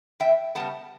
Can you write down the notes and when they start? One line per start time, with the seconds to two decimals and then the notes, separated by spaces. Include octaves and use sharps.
0.20 E2 E5 G5
0.55 C#3 G3 B3 F#5 A5